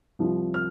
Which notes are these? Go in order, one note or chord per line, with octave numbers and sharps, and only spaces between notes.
C2 C3 F3
F6